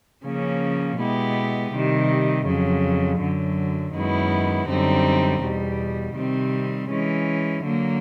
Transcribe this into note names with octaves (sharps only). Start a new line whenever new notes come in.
C#3 F3 A#3 C#4
B2 G#3 B3 E4 G4
C3 D#3 G3
F2 C#3 F#3
F#2 D3 F#3
F#2 D#3 G#3 B3 E4
F#2 D3 G3 C4 D#4
E2 B2 G3
C3 D#3 G3 C4
E3 G#3 C#4
D3 F#3 A#3